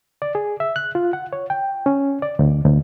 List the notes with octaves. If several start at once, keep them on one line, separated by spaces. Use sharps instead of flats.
D5
G#4
E5
F#6
F4
F#5
C#5
G5
C#4
D5
D2
D2